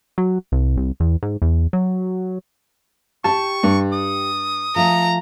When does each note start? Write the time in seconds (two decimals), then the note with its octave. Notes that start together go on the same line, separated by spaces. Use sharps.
0.18 F#3
0.52 C2
0.77 C2
1.00 E2
1.23 G#2
1.42 E2
1.73 F#3
3.24 G4 G5 A5 C#6
3.63 G2
3.92 D#6
4.76 F3 A3 E5 A#5